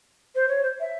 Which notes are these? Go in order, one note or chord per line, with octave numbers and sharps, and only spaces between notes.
C5
C#5
C5
E5